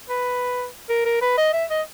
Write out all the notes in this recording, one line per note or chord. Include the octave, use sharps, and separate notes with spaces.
B4
A#4
A#4
B4
D#5
E5
D#5